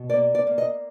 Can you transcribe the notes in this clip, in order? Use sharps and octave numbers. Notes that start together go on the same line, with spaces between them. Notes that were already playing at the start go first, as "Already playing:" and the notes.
Already playing: B2
A#3 D5
D5
A#3
D#5